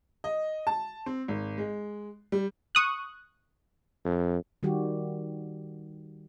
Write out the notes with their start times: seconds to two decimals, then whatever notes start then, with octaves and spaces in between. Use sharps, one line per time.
0.24 D#5
0.67 A5
1.06 C4
1.28 G#1
1.58 G#3
2.32 G3
2.75 C#6 D#6 F#6
4.05 F2
4.63 D#3 G3 F#4 G4